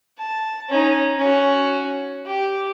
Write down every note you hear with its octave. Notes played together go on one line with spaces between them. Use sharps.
A5
C#4 D#4
C#4 F#4
G4